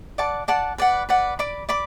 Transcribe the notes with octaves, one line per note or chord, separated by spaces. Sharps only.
D5 F#5 A5 D6
D5 F#5 A5 D6
B4 D5 F#5
B4 D5 F#5
D5 B5 D6
D5 B5 D6